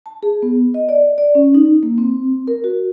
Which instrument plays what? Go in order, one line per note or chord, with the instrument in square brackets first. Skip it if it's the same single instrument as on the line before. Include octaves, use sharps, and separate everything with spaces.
[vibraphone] A5
G#4
B3
D#5
D5
D5
C#4
D#4
A#3
C4
A#4
F#4